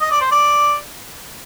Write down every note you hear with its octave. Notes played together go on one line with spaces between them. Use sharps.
D#5
D5
C5
D5